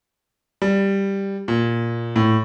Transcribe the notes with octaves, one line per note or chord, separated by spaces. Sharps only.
G3
A#2
A2